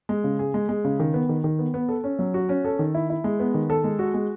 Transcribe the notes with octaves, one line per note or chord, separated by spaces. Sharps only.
G#3
C#3
G#4
G#3
G#3
C#3
D#3
B3
D#3
D#3
B3
B3
A4
C#4
F#3
F#4
C#4
A4
D#3
E4
E4
G#3
B3
D#3
A4
G#3
F#4
G#3